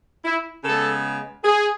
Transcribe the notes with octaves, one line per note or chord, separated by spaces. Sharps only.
E4
C#3 G#3 B3 A4
G#4